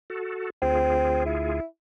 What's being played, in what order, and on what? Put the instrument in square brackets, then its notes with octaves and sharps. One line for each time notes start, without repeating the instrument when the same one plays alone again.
[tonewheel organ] F#4 A4
[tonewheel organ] D2 F4 G#4 [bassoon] C4
[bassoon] E4